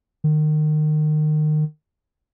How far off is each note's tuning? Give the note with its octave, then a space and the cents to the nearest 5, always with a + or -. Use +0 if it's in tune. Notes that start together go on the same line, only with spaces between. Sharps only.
D#3 -30